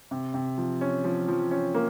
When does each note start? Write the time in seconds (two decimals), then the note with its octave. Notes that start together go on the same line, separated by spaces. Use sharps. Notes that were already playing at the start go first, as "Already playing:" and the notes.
0.11 C3
0.34 C3
0.58 F3
0.81 C#4
1.04 F3
1.28 F3
1.51 C#4
1.75 A#3